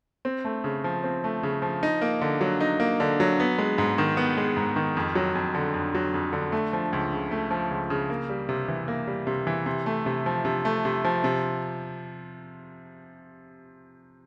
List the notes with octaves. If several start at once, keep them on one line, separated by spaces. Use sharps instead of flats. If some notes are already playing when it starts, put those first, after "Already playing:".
C4
A3
C#3
F3
C4
A3
C#3
F3
D#4
A#3
D3
F#3
D#4
A#3
D3
F#3
B3
G#3
G#2
D#3
B3
G#3
G#2
D#3
F2
F#3
F2
D3
F2
F#3
F2
D3
A3
F3
C#2
C#3
A3
F3
C#2
C#3
A#3
G3
C3
E3
A#3
G3
C3
E3
C3
A3
C3
F3
C3
A3
C3
F3
C3